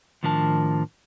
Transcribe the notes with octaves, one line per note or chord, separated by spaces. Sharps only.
A2 D#3 F3 D4 A#4 A5